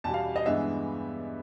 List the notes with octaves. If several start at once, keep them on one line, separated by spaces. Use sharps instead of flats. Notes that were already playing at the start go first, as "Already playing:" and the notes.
E2 B2 G3 A5
F5
D#5
G2 E3 G#3 B3 E5